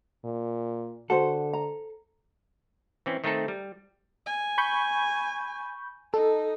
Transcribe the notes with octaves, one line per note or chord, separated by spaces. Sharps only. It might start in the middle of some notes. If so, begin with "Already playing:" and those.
A#2
D3 F#4 A4 C5
A#5
E3 C4 C#4
D#3 A3 C4 D#4 A4
G3
G#5
B5 C#6 G6
D#4 A4